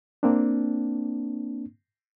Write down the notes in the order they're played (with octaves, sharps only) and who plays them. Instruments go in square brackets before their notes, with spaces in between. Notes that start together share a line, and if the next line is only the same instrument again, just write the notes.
[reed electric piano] A#3 C4 D4